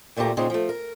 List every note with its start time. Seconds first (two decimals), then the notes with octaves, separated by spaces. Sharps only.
0.17 D2 A#2 A3 A#3 G4 A#5
0.37 A#2 C#3 C4 D#4 G#4
0.50 F3 A3
0.69 A#4